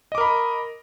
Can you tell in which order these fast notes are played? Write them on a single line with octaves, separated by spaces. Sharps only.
D#5 D6 A#4 B5